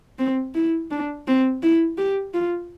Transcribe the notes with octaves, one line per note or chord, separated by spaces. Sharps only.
C4
E4
D4
C4
E4
G4
F4